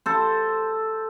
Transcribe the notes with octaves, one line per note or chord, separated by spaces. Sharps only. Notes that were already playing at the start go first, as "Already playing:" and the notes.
A4 C5